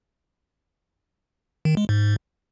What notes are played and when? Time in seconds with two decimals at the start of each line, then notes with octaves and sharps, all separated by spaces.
1.65 D#3
1.77 G#3
1.89 G#2